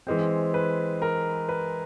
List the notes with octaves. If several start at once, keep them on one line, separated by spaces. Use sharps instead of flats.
E3 G#3 C4 C5
B4
A#4
B4